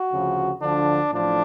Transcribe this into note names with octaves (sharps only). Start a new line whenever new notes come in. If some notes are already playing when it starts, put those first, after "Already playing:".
Already playing: F#4
D2 C#3 F3
D2 D3 F3 D4
A1 A2 F3 D4